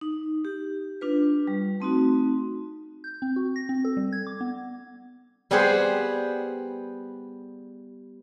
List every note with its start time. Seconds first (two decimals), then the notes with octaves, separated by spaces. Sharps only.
0.01 D#4
0.45 G4
1.01 D4 F4 B4
1.47 G3
1.80 A3 C4 D#4 F#4
3.04 G6
3.22 C4
3.36 F#4
3.56 A#6
3.69 C4
3.85 A4
3.97 G3
4.13 G#6
4.27 D6
4.41 B3
5.51 G3 B3 G4 G#4 B4 C5